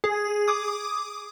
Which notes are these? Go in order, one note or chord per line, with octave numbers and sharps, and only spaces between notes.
G#4
D6 D#6